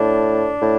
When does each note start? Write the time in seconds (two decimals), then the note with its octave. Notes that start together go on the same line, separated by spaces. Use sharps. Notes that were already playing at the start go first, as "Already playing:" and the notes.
Already playing: A2 D4
0.62 A2